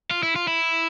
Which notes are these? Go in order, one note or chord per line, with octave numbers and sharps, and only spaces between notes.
F4
E4
F4
E4